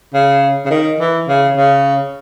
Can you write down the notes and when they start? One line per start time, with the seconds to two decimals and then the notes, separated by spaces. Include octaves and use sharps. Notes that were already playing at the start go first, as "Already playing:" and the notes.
0.14 C#3
0.65 C#3
0.71 D#3
1.00 E3
1.28 C#3
1.57 C#3